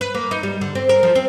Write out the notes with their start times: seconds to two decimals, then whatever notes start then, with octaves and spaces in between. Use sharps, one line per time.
0.01 B4
0.14 A#3
0.31 D#4
0.43 G3
0.61 D3
0.75 C4
0.89 A#4
1.03 F3
1.15 C4